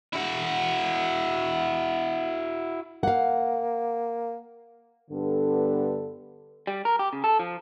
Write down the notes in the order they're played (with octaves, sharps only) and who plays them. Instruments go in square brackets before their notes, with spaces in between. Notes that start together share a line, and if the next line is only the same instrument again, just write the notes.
[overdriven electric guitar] E4 F#4
[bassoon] A#3 [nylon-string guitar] F5 F#5
[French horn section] G2 D3 B3 A4
[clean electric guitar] G3
A#4
G4
C#3
A4
F3